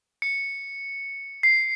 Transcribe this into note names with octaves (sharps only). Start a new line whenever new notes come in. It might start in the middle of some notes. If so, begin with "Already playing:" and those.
C#7
C7